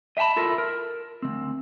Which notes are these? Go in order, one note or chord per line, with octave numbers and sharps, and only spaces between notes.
D#5 E5 G5 A5 B5
E4 F4 A4 A#4
A#4
D2 E3 C4